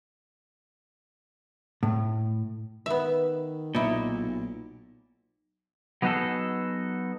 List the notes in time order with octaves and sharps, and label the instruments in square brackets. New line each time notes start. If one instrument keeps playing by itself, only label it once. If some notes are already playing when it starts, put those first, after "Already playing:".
[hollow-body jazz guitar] A2
[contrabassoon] D#3 [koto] B3 E5
[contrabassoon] B1 [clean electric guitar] A#2 [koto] D#4 E4
[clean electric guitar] F#3 B3 D#4 F#4 G#4 A4